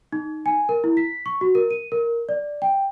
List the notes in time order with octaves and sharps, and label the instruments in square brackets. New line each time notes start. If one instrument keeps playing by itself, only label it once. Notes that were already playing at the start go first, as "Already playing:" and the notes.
[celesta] D#4
G#5
A#4
E4
B6
C#6
F#4
A#4
D#7
A#4
D5
G5